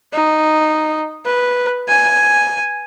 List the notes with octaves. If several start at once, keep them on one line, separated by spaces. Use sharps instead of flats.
D#4
B4
G#5